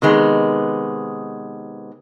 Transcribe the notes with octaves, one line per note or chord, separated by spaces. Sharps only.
C3 D#3 G#3 B3